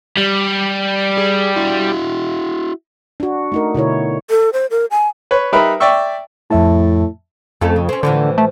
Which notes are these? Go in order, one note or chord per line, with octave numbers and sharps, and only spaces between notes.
G3
G#4
E4 F#4
D4 F#4
A3 D#4 A#4
B2 D3 E4 C#5
A4
C5
A#4
G#5
B4 C#5
G3 D#4 A#4 B4 E5 B5
D5 E5 G5 C#6 E6
F2 A2 E5 A5
F2 A3 C#4 A4
C#3
C4 C#4
A2 D3 E3 F3
A3